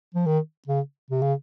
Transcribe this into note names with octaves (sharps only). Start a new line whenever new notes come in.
F3
D#3
C#3
C3
C#3